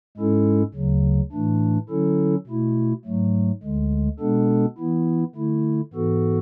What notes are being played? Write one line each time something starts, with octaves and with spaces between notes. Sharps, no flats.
G#2 G#3 C#4 E4 A4
D2 C#3 F#3
A2 E3 A3 D4
D3 F#3 C#4 E4 A4
B2 A3 E4
G#2 F#3 A3
D2 D3 G#3
B2 G#3 B3 D4 A4
E3 B3 E4
D3 A3 E4
G#2 E3 B3 F#4 A4